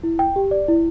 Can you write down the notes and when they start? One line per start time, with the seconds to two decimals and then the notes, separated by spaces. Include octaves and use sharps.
0.03 E4
0.19 G5
0.36 G4
0.51 D5
0.68 E4